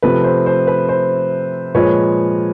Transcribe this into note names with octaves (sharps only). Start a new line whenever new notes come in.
C3 F3 A3 B4
C5
C5
B4
C5
A#2 F3 G#3 B4 C#5